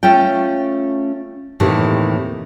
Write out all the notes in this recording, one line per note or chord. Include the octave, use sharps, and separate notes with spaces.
A3 C#4 F4 G5
D#2 A2 C3 D#3 E3